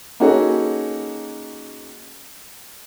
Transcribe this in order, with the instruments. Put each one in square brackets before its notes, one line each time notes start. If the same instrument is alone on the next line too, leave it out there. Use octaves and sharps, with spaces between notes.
[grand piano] A#3 C#4 D#4 F#4 G#4 A4